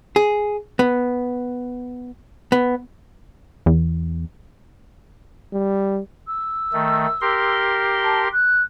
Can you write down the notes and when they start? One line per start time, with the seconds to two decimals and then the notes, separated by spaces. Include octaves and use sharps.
0.16 G#4
0.79 B3
2.52 B3
3.66 E2
5.53 G3
6.27 E6
6.73 D#3 A3
7.21 G4 A#4 C6
8.03 A5
8.33 F#6